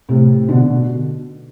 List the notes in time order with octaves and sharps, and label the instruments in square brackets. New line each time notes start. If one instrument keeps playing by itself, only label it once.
[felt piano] A2 C3
B2 D3